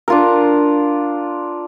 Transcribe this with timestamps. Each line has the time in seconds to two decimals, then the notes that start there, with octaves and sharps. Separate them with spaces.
0.08 D4 F4 A#4